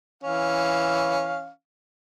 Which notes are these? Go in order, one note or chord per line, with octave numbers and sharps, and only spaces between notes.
E3 C#4 F5